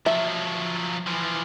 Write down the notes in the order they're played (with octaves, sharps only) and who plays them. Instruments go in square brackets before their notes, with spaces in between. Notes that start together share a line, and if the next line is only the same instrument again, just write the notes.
[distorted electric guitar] F3 F#3 [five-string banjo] E5
[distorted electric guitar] E3 F3